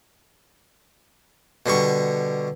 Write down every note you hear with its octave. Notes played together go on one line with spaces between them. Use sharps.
B2 D3 G3 C#6